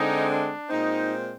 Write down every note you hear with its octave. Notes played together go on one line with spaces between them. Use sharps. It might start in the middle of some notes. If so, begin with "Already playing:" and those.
Already playing: D3 G#3 C4 D#4
D4
A#2 G#3 C4 D#4